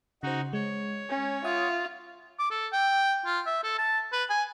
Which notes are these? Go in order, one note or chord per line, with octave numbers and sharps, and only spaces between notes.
C#3 D#4 F#4 C5
G#3 C#5
C#4
F4 E5 F#5 D#6
D6
A4
G5
F4
E5
A4
A5
B4
G#5